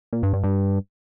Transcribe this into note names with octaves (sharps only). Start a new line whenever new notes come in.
A#2
G2
G2
G2